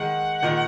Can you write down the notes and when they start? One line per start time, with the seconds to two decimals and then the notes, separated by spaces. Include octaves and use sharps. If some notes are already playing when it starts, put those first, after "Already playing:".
Already playing: D#3 G#3 F#5
0.43 A#2 D#3